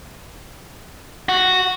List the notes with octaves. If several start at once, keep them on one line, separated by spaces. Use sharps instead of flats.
F#4